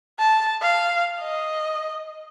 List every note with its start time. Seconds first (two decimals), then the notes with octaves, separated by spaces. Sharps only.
0.19 A5
0.62 F5
1.20 D#5